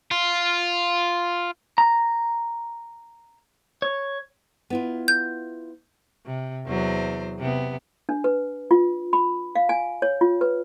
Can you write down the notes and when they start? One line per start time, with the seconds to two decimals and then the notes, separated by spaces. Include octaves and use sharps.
0.11 F4
1.78 A#5
3.82 C#5
4.70 B3 E4 F4
5.08 G6
6.26 C3
6.66 E2 F#3 C5
7.39 C3 B3
8.09 D4
8.24 B4
8.71 F4
9.13 B5
9.55 F5
9.69 G#5
10.02 C#5
10.21 F4
10.41 B4